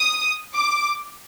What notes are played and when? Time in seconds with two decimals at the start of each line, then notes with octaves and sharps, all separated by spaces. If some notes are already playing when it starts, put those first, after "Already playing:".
Already playing: D#6
0.55 D6